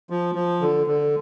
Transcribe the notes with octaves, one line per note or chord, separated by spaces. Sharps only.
F3
F3
D3
D3